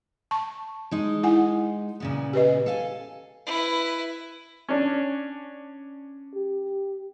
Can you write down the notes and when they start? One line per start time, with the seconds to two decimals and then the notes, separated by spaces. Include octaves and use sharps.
0.31 A5 C#6
0.91 G#3 D#4
1.23 E4 F#5 G#5
2.00 A#2 C#3 B3
2.33 G4 B4 D#5
2.66 A4 F5 G#5
3.46 E4 B4
4.69 C#4 D4
6.35 G4